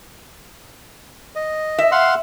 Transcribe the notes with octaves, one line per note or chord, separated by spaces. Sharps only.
D#5
E5
F5 F#5 C6